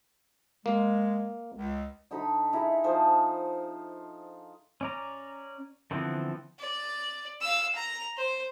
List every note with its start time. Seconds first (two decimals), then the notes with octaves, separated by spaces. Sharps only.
0.66 G#3 A#3
1.56 C#2
2.11 D3 D#4 A4 B5
2.53 D#4 E4 G#4
2.84 F3 D#4 A4 C5
4.81 C#4 D5 A#5
5.91 D3 E3 F3 B3 C4
6.59 D5
7.41 F5 E6
7.75 A#5
8.17 C5